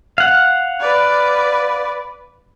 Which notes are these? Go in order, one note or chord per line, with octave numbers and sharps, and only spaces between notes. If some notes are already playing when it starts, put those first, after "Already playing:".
F5 F#5
B4 D5